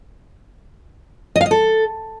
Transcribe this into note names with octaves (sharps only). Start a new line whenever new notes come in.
D#5
F5
D#5
A4